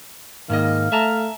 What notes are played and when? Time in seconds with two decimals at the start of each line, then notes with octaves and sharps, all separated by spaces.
0.50 G#2 D#3 A#3 D#5 F5
0.92 A3 E5 A5 A#5